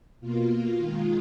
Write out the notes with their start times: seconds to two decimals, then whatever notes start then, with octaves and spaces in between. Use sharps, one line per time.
0.21 B2 A#3 F4
0.50 F4
0.78 D#3 G#3